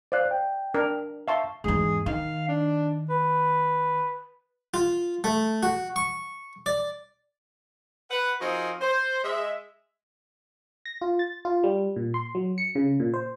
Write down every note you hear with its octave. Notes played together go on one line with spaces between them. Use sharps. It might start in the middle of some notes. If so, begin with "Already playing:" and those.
C5 D5 F5 F#6
G5
D4 A#4
E5 F5 A5 C6 C#6
E2 G#2 G#4
D#3 F5
D4
B4
F4
A3
F#4
C#6
D5
B4 F#5
F3 C4 D#4 F#4 G#4 A#4
C5
G#3 E5
A#6
F4
A6
F4
G3
A#2
C6
F#3
C#7
C#3
A#2
C5